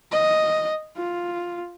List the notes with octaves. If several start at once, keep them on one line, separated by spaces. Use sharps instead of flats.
D#5
F4